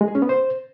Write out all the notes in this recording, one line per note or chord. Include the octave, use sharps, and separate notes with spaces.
G#3
G#4
C#4
B3
C5